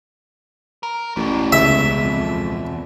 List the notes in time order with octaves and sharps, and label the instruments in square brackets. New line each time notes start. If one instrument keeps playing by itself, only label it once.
[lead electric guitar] A#4
[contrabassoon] A1 [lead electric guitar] E2 B2
[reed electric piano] C#2 G#3 [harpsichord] E5
[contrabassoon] F2